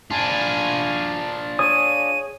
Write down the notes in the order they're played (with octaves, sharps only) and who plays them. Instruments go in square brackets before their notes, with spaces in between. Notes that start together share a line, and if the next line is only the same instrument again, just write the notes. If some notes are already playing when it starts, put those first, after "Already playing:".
[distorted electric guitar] D4 F4 [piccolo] G#5
[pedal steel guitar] G#4 C#5 D#6 [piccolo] D#7